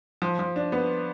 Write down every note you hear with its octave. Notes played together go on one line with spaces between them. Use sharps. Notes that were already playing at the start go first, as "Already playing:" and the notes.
F3
F3
D4
B3